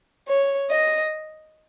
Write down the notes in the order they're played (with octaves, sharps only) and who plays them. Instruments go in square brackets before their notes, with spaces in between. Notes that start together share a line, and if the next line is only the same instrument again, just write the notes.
[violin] C#5
D#5